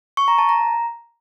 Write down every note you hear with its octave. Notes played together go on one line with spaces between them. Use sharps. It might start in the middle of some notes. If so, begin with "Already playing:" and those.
C#6
A#5
A5
A#5